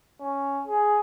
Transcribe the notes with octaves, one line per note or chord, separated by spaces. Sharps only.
C#4
G#4